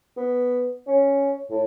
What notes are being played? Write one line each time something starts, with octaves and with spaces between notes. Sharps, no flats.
B3
C#4
A2